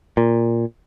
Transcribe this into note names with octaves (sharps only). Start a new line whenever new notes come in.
A#2